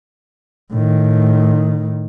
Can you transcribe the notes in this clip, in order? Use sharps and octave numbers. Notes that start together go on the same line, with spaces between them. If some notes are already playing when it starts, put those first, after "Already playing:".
A2 D#3